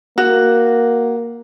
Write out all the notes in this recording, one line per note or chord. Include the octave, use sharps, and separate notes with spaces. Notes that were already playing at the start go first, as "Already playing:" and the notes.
A#3 F#4